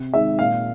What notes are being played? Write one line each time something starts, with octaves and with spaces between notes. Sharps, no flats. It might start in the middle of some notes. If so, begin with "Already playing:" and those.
Already playing: C3
D#3 G#3 E5
A#2 F5